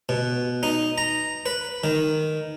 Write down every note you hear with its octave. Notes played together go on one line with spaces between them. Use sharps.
B2
D#4
A#5
B4
D#3